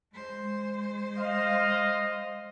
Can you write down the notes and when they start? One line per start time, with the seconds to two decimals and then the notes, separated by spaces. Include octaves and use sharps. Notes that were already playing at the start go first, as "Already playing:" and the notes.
0.13 G#3 C5
1.17 D#5 F5